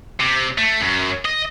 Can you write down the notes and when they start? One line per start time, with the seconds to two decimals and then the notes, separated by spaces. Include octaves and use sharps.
0.20 C3
0.58 A3
0.81 F#2
1.25 D#5